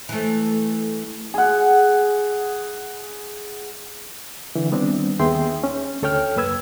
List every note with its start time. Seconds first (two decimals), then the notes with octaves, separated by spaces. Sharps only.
0.09 E3 A3
1.34 G#4 F#5
4.55 D3 E3
4.71 D#3 G3 B3 C4 D4
5.19 D#2 B3 G#4 E5 G5 C6
5.64 C#4
6.02 D2 A4 C#5 G5 F6
6.36 C#2 F#2 A#3 B4 E6 G#6